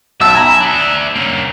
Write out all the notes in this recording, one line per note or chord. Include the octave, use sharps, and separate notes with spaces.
B1 E5 A5 E6
G#5 A#5 B5
D4 E5
A#3 C#4